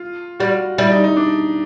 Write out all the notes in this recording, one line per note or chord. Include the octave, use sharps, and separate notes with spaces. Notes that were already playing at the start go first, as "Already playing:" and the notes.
Already playing: F4
G3 F#4
G3 E4
D#4
D#4
D4